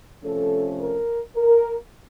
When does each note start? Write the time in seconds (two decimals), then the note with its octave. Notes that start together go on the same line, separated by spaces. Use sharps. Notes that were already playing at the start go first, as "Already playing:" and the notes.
0.24 C3 F3 A3 C#4 A4
0.80 A#4
1.36 A#4